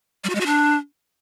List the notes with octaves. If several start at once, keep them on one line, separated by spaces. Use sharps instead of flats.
G3
F#4
G#3
F#4
D4